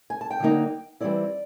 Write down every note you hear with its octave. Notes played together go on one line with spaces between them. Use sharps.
G#5
A5
G5
D3 F#3 A#3 D#4
E3 G3 C4 E4 D5